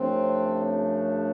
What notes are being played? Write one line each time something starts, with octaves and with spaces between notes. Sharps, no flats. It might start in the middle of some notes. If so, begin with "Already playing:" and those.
Already playing: F#2 C#3 F3 A3 C4 D4